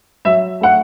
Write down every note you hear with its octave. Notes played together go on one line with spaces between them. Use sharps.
F#3 E5
A3 F#5